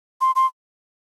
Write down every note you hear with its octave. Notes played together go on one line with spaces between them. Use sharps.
C6
C6